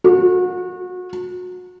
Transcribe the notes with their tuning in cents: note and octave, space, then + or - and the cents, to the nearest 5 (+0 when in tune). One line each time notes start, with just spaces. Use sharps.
F#4 -30